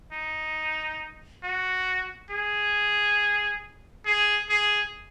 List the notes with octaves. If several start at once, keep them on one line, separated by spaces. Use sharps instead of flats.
D#4
F#4
G#4
G#4
G#4